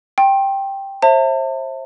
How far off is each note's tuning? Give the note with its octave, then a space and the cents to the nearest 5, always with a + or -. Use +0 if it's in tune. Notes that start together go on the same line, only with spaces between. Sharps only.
G5 +0 C6 +35
C5 +35 E5 +0 A5 +40